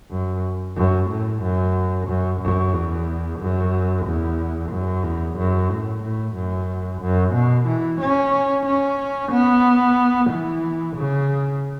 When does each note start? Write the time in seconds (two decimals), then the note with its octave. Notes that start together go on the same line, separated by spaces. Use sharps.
0.11 F#2
0.77 F#2
1.09 A2
1.43 F#2
2.08 F#2
2.41 F#2
2.74 E2
3.40 F#2
4.06 E2
4.71 F#2
5.04 E2
5.38 F#2
5.70 A2
6.03 A2
6.36 F#2
7.01 F#2
7.35 B2
7.67 E3
8.00 C#4
8.65 C#4
9.32 B3
10.30 E3
10.96 C#3